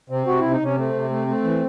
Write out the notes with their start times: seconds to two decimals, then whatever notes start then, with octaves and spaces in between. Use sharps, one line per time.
0.10 C3 C4
0.27 C3 F#4
0.39 C3 E4
0.51 D#4
0.60 C3 C#4
0.76 A3 C4
0.94 C3
1.10 A3
1.27 A3
1.43 E3